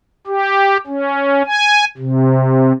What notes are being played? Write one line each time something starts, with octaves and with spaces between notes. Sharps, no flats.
G4
C#4
G#5
C3